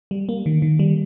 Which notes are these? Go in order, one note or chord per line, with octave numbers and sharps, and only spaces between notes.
G3
A#3
D#3
D#3
G3